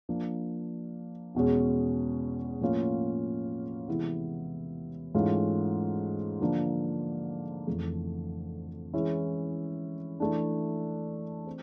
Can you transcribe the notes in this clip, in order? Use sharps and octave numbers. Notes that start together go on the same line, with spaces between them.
F3 A#3 D4
E2 B2 G#3 C#4
A2 F3 A#3 C#4 F4
C3 E3 G#3 B3 E4
G#2 E3 A3 C#4 F4
D3 F3 A#3 D4
F2 C#3 E3 A3
E3 G#3 C#4 E4
E3 A3 D4
C4